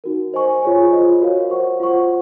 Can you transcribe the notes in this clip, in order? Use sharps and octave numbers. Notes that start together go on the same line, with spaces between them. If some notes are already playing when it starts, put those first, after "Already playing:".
D#4 F#4 A#4
C5 D#5 G#5 C#6
F4 G#4 C#5 G#5
F4 C5 D#5
F#4 A#4 C#5 F5
C5 F#5 C#6
F4 C5 F#5 C#6